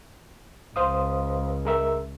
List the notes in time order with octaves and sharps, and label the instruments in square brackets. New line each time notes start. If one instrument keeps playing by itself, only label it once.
[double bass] C#2 [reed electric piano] C5 F5 D#6
[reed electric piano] G#3 A#4 E5